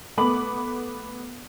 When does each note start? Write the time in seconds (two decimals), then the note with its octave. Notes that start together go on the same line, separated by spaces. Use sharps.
0.18 A3 B3 B5 D6 F#7